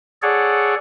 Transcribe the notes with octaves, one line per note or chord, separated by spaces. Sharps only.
G#4 A4 C#5 D5 F#5